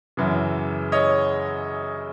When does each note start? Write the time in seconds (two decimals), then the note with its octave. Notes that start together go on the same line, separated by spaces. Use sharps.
0.17 F#2 C#3 E3
0.92 C#5 D#5